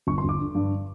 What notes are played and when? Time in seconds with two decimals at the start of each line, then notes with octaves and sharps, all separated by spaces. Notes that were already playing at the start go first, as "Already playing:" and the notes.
0.07 G1 C#6
0.18 C6
0.24 G1
0.29 D6
0.40 D3
0.55 G2